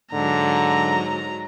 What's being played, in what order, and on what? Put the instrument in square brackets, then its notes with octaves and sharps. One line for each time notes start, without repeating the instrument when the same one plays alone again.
[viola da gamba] G#2 F#3 [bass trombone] D3 [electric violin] A#5